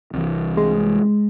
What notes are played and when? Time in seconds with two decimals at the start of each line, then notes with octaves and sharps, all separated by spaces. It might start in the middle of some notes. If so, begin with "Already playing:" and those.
0.13 C2 E3
0.57 G#3